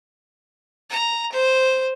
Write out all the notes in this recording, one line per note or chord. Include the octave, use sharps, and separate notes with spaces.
A#5
C5